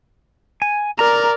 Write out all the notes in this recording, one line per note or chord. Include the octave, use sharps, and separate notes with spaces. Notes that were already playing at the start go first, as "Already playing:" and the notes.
G#5
A#4 D5 A#5